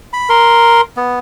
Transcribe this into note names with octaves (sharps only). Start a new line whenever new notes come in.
B5
A#4 C6
B3